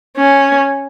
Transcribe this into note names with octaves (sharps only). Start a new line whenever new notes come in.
C#4